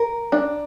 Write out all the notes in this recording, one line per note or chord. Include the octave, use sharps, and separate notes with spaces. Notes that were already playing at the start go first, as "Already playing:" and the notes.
Already playing: A#4
D4